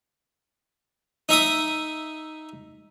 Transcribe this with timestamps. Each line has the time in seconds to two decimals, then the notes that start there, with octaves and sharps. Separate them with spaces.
1.29 D#4 E5 D#6